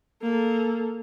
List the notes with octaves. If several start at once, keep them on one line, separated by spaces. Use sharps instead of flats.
A#3 A4